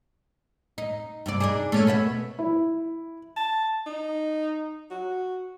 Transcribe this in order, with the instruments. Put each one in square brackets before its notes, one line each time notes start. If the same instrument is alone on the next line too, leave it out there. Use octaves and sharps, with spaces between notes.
[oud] D#4
G2 C3 D5
D4 D#4 G#4
A3 C#4
B2 B4 E5
[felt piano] E4
[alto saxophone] A5
D#4
F#4